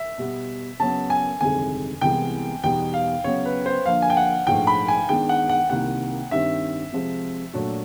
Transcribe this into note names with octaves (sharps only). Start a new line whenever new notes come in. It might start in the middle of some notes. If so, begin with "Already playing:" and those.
Already playing: E5
B2 G3 B3
C#3 F#3 B3 A5
G#5
G1 F2 C3 D#3 G#3 G#5
C2 C3 E3 G#3 B3 G5
E2 B2 G3 B3 D#4 G5
F5
C#3 F#3 B3 C#5
B4
C5
D3 F3 A#3 F5
G#5
G5
F#5
A#1 G#2 F3 A3 G5
B5
G#5
D#3 G#3 B3 D4 G5
F#5
F#5
C2 C3 D#3 G3 A#3 F#5
G2 D#3 G3 C4 E5
C3 F3 G#3 C4
A#2 F#3 A3 D4 F#4